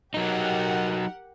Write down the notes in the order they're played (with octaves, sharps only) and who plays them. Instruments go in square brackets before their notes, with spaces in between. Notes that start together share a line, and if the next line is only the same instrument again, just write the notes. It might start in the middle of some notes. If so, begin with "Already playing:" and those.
[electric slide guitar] F#3 D#4 [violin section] G4 A#4 F#5